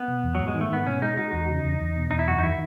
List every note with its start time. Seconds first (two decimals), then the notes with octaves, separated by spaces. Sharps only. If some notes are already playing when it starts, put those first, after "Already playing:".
Already playing: B3
0.08 B2
0.23 E2
0.35 G#2 F#3
0.47 G#3
0.54 D#3
0.61 A3
0.71 G#2 B3
0.86 B2 C#4
1.02 G#3 D#4
1.17 D#4 F#4
1.33 E2
1.49 C#3
1.65 E2
1.80 E2
1.96 B2
2.11 E2 D#4
2.19 E4
2.27 F#2 F#4
2.38 D#4
2.43 D#3 E4